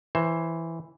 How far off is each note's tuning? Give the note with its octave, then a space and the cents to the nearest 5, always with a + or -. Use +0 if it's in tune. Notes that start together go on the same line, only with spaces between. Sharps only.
E3 +0 C5 +20